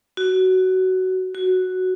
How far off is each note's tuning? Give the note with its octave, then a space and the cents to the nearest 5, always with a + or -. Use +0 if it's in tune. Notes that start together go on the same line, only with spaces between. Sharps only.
F#4 +15
F#4 +0